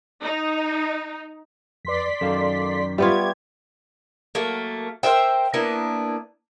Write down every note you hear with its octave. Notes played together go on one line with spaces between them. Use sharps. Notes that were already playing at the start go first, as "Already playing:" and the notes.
D#4
F2 B4 D5 C6 B6
F#2 D#3 A4 F5
G3 B3 F4 G4 E5 C#6 G#6
F#3 A3 A#3
A#4 C5 E5 G5
A#3 B3 D4 E4